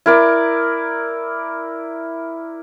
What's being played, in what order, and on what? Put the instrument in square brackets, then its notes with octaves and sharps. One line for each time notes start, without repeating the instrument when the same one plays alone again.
[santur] E4 A#4 D5